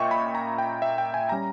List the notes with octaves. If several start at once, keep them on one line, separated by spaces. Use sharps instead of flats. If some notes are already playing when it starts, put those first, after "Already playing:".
Already playing: A#2 C#4 D#5 E5 G5 C#6
B5
A#5
G5
E5
G5
G#5
G3 C#4 A#5